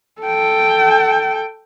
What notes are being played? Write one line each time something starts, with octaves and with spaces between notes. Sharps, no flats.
A4 G5